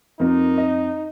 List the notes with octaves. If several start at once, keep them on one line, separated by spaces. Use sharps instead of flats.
F2 A#3 D#4 F4 A#4
D#5